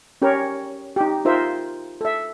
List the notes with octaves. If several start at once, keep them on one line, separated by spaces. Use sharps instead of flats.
C#4 G4 A#4 C#5
D#4 G4
D#4 F4 A#4 C5 E5
A4 E5